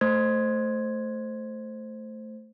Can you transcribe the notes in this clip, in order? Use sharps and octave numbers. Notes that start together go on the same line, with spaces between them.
A3 C5 G#6